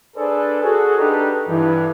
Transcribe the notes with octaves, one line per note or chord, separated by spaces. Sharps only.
D4 G#4 A4 B4 C5 D5
F#4 G#4 A4
D4 D#4 G4 A4 B4
G2 E3